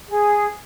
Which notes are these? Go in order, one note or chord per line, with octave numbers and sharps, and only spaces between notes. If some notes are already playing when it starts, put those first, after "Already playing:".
G#4